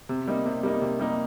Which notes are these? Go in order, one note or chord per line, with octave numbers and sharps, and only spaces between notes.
C3
G3 A#3 D#4
C3
G3 A#3 D#4
C3
G3 A#3 D#4